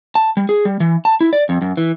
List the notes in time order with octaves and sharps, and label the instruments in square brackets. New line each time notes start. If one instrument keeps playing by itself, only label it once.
[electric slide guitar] A5
G3
G#4
G3
E3
A5
E4
D5
F2
F#2
E3